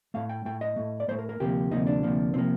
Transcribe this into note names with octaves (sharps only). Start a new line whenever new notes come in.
A2 A3 F5
G5
A2 A3 G5
D#5
A2 A3
D5
A2 A3 C5
A#4
A#4
D2 C3 F3 A#3 G4
D2 C3 F3 A#3 D#4
D4
D2 C3 F3 A#3
C3 F3 A#3 C4